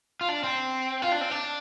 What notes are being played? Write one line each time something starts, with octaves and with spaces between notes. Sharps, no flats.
F4
D4
C4
F4
D4
C4
D4